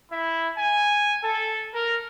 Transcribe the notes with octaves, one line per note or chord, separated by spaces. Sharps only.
E4
G#5
A4
A#4